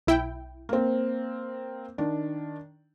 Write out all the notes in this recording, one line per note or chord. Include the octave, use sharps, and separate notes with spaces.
B1 E4 G5
A#3 C4
D#3 D4